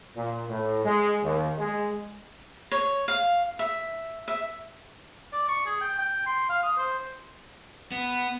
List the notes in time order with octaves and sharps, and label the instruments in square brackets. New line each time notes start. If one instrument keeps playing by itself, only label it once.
[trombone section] A#2
A2
G#3
D#2
G#3
[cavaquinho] C#5
F5
E5
E5
[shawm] D5
C#6
G#4
G5
G5
C6
F5
D#6
C5
[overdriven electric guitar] B3